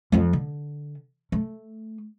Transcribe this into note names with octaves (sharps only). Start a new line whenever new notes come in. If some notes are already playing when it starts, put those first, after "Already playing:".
F2 F3
D3
A3